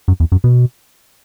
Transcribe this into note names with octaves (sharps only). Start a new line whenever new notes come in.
F#2
E2
F#2
B2